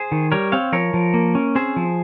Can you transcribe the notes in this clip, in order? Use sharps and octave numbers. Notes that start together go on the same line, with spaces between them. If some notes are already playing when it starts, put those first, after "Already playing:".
Already playing: G#4 C5
D#3
G3 A#4 C#5
C4 C#5 F5
F3 A#4 C#5
F3
A#3
C#4
C4 G#4 C5
F3